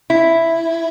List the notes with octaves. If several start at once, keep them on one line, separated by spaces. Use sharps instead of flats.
E4